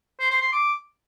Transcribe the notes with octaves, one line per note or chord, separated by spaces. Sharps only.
C5
C5
C6
D6